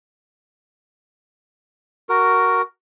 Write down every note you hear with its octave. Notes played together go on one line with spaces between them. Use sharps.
F#4 A#4